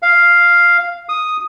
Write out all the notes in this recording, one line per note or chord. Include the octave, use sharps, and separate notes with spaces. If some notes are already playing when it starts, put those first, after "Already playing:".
F5
D#6